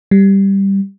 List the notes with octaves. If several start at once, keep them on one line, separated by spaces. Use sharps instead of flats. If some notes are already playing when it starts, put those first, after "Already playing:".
G3